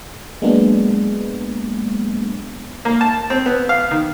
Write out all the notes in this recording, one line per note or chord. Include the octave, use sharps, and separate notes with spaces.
F#3 G#3 A#3 B3 D4
A#3
A5
C4
B3
F5
D#3